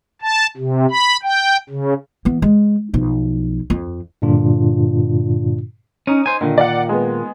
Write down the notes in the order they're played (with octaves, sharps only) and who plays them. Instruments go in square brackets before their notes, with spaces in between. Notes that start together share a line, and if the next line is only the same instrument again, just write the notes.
[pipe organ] A5
C3
B5
G5
C#3
[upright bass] E3 B3
G#3
B1 F3
F2
[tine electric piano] G2 A#2 D3 D4 F4
[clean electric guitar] C#4 [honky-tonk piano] D#4 D#7
[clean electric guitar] C5 G#5
[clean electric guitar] A#2 D#3 [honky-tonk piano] D3
[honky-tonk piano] D5 F5 F#5
G#3 B3